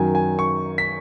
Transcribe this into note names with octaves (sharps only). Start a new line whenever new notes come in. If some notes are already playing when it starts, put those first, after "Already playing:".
Already playing: F#2 D#3 F#3 G#5
G#5
C#6
B6